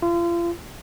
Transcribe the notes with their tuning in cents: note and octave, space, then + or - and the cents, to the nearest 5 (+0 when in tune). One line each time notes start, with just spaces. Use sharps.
F4 -35